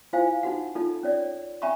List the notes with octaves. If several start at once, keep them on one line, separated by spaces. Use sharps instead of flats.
E4 F4 C5 F5 G#5
D#4 F#4 F#5
D#4 F4 A4
C#4 C#5 D5
C#4 E5 G#5 A#5 B5 C#6